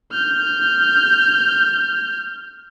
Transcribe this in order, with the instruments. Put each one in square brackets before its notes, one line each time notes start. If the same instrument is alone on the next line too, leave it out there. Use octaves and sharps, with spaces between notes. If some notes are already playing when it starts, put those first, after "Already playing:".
[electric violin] F6 G6